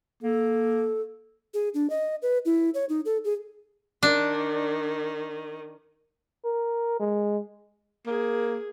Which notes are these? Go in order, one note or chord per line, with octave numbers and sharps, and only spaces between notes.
A#3 A4
G#4
D4
D#5
B4
E4
C#5
D#4
A4
G#4
D#3 D4
A#4
G#3
A#3 G#4